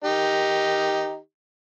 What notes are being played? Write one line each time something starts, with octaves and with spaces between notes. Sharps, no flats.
D#3 D#4 G4